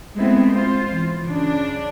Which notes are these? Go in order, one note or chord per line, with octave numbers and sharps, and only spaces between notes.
G#3 A3 B3 C4 E4
F4 C5
E3
C#3 D4